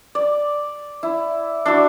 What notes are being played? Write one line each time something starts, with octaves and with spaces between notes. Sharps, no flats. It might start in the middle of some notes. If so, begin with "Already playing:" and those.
D5
E4
D4 E4 F#4